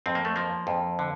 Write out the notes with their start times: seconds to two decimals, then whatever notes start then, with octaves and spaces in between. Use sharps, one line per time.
0.06 F2 C4
0.15 A#3
0.25 A3
0.36 F3 A#3
0.67 F2
0.99 D3